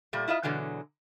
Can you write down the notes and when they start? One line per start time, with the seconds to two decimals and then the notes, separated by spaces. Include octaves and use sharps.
0.13 A#2 G3 A3
0.28 E4 F4 D#5 E5
0.43 B2 D3 E3 F#3 G#3